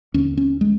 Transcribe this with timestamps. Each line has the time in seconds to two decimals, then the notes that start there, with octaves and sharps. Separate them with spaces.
0.14 D#2 D3 C#4
0.37 C#4
0.61 G#3